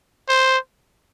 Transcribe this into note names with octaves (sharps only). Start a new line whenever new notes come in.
C5